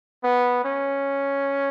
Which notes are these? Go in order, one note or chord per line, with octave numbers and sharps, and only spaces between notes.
B3
C#4